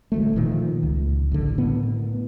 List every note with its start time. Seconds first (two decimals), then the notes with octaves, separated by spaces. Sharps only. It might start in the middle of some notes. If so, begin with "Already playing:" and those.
0.12 D1 D2 A3
0.36 A#2 D#3 F3
0.83 C#2
1.32 A1 D3
1.58 A2 B3